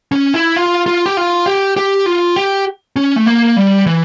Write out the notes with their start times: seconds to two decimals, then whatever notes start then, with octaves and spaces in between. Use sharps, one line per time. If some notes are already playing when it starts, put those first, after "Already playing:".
0.12 C#4
0.34 E4
0.56 F4
0.86 F4
1.06 G4
1.17 F4
1.46 G4
1.77 G4
2.06 F4
2.36 G4
2.96 C#4
3.16 A3
3.26 A#3
3.57 G3
3.86 E3